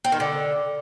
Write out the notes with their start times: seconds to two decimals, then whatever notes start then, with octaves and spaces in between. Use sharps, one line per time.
0.04 C4
0.12 D#3
0.20 D3